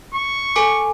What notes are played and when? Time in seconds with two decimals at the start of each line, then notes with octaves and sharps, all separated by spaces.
0.14 C#6
0.56 A4 G#5 D6